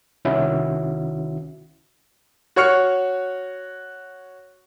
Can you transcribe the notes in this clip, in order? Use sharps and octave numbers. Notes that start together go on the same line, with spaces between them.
C2 D#3 C#4 E4 F#4 E5
F#4 C#5 C#6 F6 C#7